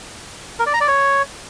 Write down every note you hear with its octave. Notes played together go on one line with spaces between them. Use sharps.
A#4
D5
A#5
D5
C#5